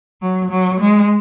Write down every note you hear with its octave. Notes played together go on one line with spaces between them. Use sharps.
F#3
F#3
G#3